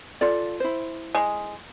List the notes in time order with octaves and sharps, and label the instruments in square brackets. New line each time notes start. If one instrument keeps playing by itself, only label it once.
[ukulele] F4 A4 D5
E4 C5
[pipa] G#3